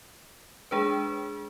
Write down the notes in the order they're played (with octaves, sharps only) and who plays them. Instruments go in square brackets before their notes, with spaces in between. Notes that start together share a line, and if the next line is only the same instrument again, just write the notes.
[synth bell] G#3 D4 G#4 B4